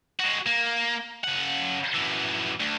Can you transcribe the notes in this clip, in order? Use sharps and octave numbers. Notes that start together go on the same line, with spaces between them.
G#3 F#4
A#3
C#3 F#5
F#2 E3
D2